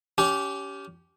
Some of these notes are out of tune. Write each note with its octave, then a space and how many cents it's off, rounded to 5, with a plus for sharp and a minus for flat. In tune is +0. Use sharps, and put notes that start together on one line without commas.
C#4 +25 G4 -15